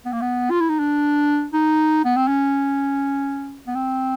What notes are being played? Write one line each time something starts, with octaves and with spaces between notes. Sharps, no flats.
B3
A#3
B3
F4
E4
D#4
D4
D#4
B3
C4
C#4
B3
C4